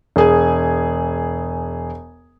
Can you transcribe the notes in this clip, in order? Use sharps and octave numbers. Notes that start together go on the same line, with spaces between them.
E1 G#4 G#5